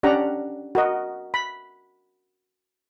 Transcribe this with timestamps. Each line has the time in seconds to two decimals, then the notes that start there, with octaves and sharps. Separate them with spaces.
0.03 C#4 D4 G4 F#5 A#5
0.75 F#4 A#4 D#5
1.34 B5